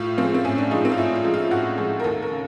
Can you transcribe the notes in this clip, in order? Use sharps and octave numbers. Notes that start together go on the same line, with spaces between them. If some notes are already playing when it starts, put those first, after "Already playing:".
Already playing: A2 F4
F3 G#3 C4
C4
A2 C#4
D4
F3 G#3 D#4
C4
F4
A2 E4
F4
F3 G#3
F4
A2 F#4
F3 G#3
A#4
D#2 A4
A#4
C#3